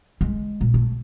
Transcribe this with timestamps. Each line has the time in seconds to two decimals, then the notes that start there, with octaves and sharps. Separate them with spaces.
0.21 G#3
0.61 A#2
0.74 A3